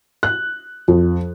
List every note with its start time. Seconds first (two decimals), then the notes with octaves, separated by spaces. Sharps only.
0.23 F#6
0.88 F2